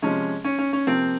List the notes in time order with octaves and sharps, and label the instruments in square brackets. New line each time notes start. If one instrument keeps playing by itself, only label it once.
[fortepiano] C3 F3 G#3 C#4
C#4
C#4
C#4
C3 F3 A#3 C4